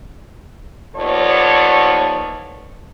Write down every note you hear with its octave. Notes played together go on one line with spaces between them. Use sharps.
D#2 F3 B3 A4 C#5 D5